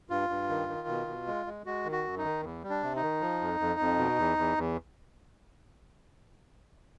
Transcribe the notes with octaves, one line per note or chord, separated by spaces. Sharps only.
G2 F4
G2
D#3
D#3
B2
B2
G#3
G#3
G#3 F#4
D#3
F#4
F#2
D#4
D#3
E2
G3
D4
C3
D#4
D#3
F3
F2
F2
F2
B2
E2
E2
E2